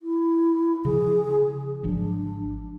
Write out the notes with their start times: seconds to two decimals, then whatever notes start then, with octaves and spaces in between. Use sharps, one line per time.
0.01 E4
0.85 C#3 F3 G#4
1.83 G#1 F3 F#3 D4